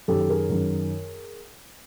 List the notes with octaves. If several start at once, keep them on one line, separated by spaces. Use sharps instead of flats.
F#2 D#3 G4 A4
G#4 A#4
F#2 D#3